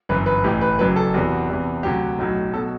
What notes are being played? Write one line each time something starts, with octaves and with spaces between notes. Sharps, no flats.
G1 F#2 E3 B4
B4
A1 A2 E3 G4
B4
F#1 F#2 F#3 B4
A4
E2 C3 E3 F#4
E2 C3 E3
D2 C3 F#3 G4
B1 A2 F#3
B2 F#3 A4